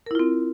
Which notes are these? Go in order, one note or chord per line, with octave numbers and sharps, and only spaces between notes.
C4 E4 F4 A#4